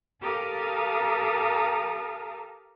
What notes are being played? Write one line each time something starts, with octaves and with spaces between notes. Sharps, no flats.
G4 A4 A#4 F5 A#5 D#6